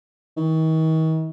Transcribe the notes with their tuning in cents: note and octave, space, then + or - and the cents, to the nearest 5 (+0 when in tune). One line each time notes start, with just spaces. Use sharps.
D#3 +40